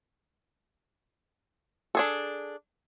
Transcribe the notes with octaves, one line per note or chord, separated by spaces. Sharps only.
D4 G#4 A4